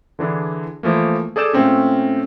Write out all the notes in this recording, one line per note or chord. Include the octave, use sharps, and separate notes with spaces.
D3 E3 D4 G#4
E3 F3 A3 A#3
G#4 A4 D5 G6 E7
A#2 A3 C4 C#4